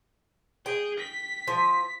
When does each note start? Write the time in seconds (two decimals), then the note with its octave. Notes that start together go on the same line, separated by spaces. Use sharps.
0.66 G#4 G5
1.00 B6
1.47 F3